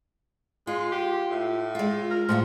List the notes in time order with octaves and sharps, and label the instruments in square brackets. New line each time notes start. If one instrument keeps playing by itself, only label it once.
[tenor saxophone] G#3 [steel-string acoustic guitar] F4
[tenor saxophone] G4
A2
[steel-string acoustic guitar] G#3 F4
[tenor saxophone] A#4
[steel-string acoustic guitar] A2 F4 F#4 [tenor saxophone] F3